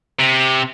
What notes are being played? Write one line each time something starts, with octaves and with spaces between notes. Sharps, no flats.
C3